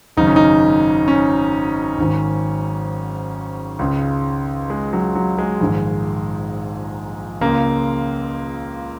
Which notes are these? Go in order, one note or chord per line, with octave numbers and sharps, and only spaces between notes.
G#1 F#2 C#3 D#4
C#4
D#4
C#4
G#1 G#2 D#3
C#2 C#3
G#3
F#3
F#3
G#3
A#1 G#2 D#3
C#2 C#3 A#3